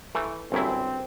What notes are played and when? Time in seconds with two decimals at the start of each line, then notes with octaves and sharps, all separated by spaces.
0.15 E3 A3
0.52 G1 F#2 C4 E4